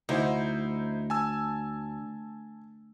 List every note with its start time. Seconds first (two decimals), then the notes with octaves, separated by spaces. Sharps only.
0.09 D2 D#4 E4 C5
1.10 G#5 A5 E6